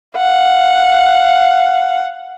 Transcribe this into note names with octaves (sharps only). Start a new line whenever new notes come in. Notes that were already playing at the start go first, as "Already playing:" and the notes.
F5 F#5